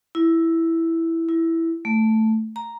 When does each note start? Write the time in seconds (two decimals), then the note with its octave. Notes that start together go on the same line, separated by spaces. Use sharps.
0.15 E4
1.29 E4
1.85 A3
2.56 A#5